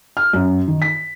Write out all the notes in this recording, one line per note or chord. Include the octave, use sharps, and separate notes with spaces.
F6
F#2
D#3
B6